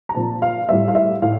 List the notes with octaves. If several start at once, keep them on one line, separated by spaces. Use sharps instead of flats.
A#5
A#2 F3 C4 A5
F5
A2 G3 C4 E5
F5
E5
A2 F5